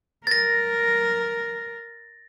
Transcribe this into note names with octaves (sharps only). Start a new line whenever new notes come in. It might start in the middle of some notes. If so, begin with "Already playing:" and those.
A#4 A6 A#6